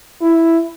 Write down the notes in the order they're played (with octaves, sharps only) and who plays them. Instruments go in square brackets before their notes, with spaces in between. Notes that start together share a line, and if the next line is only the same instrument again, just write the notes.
[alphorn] E4